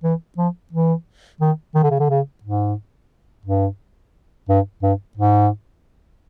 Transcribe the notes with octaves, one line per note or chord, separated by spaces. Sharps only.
E3
F3
E3
D#3
D#3
D3
C#3
D3
C#3
G#2
G2
G2
G2
G#2